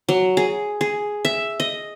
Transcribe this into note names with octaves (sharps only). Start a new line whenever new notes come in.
F#3
G#4
G#4
E5
D#5